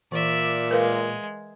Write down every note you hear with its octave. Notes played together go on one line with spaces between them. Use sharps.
A#2 E3 D5 E5
G#3 A#4 B4 F5